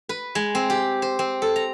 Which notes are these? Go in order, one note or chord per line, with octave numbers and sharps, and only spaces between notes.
B4
G#3
C4
G4
C5
C4
A4
A#5